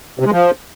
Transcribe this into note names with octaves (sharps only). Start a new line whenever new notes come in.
C3
G#3
F3